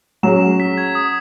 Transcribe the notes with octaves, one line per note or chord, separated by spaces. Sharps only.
F#3 C#4 G#4 E7
B6
G#6
D#6